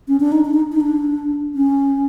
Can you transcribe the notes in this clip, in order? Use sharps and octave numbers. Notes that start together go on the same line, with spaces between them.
C#4
D4
D#4
D4
D#4
D#4
D4
C#4